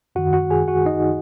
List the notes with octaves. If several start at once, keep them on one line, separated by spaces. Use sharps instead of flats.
F#2 D#3 F#4 F#5
F#4 F#5
G#4 G#5
F#4 F#5
D#4 D#5